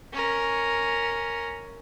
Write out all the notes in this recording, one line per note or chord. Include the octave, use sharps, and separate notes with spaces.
C#4 A#4